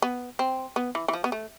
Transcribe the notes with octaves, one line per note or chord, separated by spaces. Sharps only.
B3
C4
B3
E3
E3
F3
B3
A3